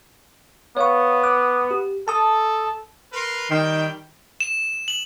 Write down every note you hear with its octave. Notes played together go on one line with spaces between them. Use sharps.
B3 C#5 F5 C#6
D6 F#6
G4
A4 A5 D#6
A#4 B4 C6
D#3 G3 G5
E7
F#7